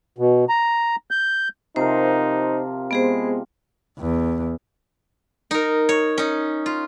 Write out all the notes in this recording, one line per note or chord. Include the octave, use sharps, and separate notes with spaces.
B2
A#5
G6
C3 F3 D#4 A#4 C5
G#3 B3 G#4 C5
E2
D#4 A#4
C#5
C#4 D#4
F4